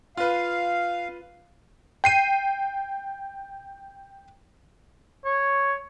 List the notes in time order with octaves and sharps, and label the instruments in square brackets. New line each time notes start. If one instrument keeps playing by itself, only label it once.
[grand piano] F4 B4 [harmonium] F5
[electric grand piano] G5 C7 D#7
[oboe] C#5